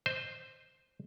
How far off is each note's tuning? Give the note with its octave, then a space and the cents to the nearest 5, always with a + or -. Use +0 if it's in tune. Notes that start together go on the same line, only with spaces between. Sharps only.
C5 +0 D#5 -25